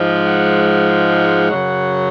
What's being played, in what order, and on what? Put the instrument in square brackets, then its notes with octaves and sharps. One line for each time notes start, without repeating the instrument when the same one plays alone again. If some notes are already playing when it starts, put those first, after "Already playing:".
Already playing: [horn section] G#2 F3 G#3
F#5
F#5
F#2 C#3 F#3